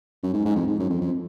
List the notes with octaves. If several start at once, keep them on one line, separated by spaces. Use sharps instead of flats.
F#2
G#2
G#2
F2
G#2
F#2
F2
F2